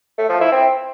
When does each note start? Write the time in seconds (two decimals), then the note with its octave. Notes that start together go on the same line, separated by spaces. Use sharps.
0.18 A3
0.29 F3
0.41 E4
0.52 C4